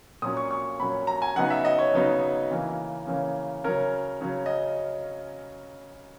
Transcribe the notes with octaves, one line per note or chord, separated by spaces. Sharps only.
A#2 F#3 C#4 D#6
C#6
C#6
A#2 F#3 C#4 B5
A#5
G#5
C#3 F#3 B3 D#4 F#5
E5
D#5
C#5
C#3 F#3 B3 D#4
C#3 E3 A#3 C#4
C#3 E3 A#3 C#4
C#3 F#3 C#4 A#4
C#3 F#3 C#4
D#5